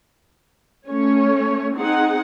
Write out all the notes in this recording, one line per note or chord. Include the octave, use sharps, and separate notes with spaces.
A3 C#4 C#5
C4 D#4 G#4 F#5